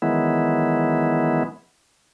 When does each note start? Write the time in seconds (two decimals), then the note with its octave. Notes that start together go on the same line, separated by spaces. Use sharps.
0.02 D#3 E3 F#3 G#3 B3 E4